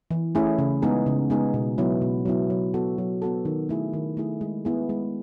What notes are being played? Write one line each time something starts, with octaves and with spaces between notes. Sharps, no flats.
E3
A3 C#4 E4 G#4
C#3
G#3 B3 D#4 G#4
C#3
G#3 B3 D#4 G#4
B2
F#3 B3 E4
B2
F#3 B3 E4
F#3
B3 F#4 A4
F#3
B3 F#4 A4
D#3
A3 E4 G#4
D#3
A3 E4 G#4
G#3
B3 E4 G#4
G#3